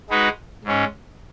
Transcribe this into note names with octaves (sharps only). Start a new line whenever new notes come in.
G#3 D#4 F#4 B4
G#2 G#3 C#4